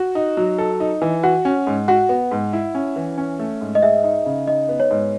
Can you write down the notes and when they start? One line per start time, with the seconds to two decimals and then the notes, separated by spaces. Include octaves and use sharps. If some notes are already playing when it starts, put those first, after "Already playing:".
Already playing: F#4
0.15 D#4
0.37 F#3
0.58 A4
0.80 D#4
1.02 E3
1.23 F#4 F#5
1.45 C#4
1.67 G#2
1.88 F#4 F#5
2.09 B3
2.31 G#2
2.53 E4
2.75 C#4
2.96 E3
3.18 C#4
3.39 A3
3.61 G#2
3.75 D#5
3.82 G#4 E5
4.04 D#4
4.26 C#3
4.47 D#4 D#5
4.69 B3
4.80 C#5
4.91 G#2